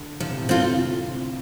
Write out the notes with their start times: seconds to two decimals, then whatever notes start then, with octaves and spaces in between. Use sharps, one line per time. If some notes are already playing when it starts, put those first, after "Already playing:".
Already playing: D3
0.20 D3 F3
0.29 C3
0.36 A2
0.43 C3
0.49 C4 F4 A4